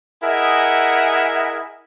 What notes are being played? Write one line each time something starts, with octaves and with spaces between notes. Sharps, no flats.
E4 G#4 A#4 D#5 E5 F#5